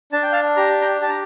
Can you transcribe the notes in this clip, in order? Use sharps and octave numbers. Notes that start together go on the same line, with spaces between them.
D4 A5
G5
F5 A5
G4 A#5
G5 A#5
G4 A5
A#5